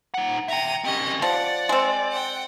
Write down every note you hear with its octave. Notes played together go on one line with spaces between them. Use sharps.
D#4 F#5
E5 G5 A#5 D#7
C4 C#4 G4 D#5
F3 D5 F#5
G#3 C4
F#5 G5